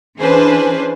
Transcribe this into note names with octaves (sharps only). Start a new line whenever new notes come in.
E3 C#4 D4 G#4 B4 C5